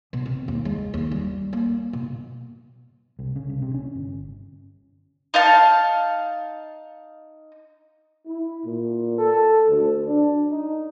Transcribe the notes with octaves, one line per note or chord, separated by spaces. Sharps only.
B2
C4
D#2
G#3
D#2
G3
A#3
B2
C2
C#3
C2
C3
C#4
G1
D#4 F5 A5
E4
A#2
A4
D2
D4
D#4